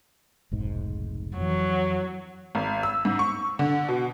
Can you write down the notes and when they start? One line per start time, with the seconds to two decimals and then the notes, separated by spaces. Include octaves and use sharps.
0.51 F1 B1 G#2
1.37 F2 E3 F#3
2.55 G#1
2.83 E6
3.05 G#2
3.19 C#6
3.59 D3
3.88 B2